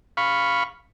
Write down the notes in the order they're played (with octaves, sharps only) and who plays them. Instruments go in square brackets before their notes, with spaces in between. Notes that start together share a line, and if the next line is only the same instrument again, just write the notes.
[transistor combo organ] F5 B5 C#6